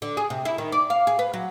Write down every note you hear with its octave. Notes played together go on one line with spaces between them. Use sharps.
D3
G#4
C3
E4
D#3
D5
F5
G#4
B4
F#3